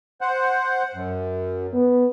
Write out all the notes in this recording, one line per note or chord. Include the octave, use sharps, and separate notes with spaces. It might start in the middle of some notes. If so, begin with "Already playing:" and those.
C5 F#5
F#2
B3